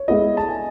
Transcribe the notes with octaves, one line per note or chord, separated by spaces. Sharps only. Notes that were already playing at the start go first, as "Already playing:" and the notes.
Already playing: C#5
G#3 B3 E4 A4 D#5
A5
G#5